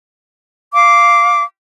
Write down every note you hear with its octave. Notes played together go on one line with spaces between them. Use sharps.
F5 D6